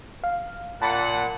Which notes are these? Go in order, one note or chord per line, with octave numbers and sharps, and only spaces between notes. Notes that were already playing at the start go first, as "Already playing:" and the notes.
F5
A#2 F#5 A5 B5 A6